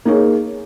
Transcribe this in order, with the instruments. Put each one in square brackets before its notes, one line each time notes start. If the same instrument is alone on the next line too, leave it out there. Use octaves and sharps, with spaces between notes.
[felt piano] A#3 D#4 G#4 C#5